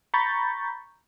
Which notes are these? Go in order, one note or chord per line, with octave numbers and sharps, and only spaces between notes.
A#5 B5 C#6 G6 A6